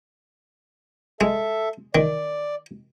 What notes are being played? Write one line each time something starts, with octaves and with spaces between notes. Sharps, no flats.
G#3 A4 E5
D#3 D5